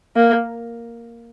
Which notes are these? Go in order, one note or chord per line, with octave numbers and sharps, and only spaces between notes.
A#3